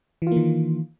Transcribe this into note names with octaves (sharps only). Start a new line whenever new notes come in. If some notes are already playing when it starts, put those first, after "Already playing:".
D#3 E3 A#3 F4